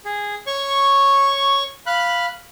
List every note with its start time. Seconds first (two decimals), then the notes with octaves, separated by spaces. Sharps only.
0.05 G#4
0.47 C#5 C#6
1.86 F5 B5 F#6